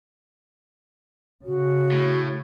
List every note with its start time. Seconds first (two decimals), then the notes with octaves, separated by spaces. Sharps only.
1.45 C#3 F#4
1.92 A2